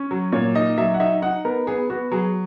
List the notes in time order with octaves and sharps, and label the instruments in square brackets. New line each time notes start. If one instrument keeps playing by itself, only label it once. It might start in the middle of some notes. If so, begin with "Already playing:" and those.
Already playing: [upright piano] C#4
F#3
A#2 C#5
D#4 D#5
F#3 E5
F#5
D#4 E5
D#4 F#5
B3 A#4
B3 G#4
B3 F#4
F#3 G#4